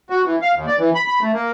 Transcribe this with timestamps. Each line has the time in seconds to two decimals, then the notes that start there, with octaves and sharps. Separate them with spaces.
0.10 F#4
0.25 E3
0.42 F5
0.55 D#2
0.67 D5
0.79 E3
0.95 B5
1.07 B5
1.21 A3
1.33 A#3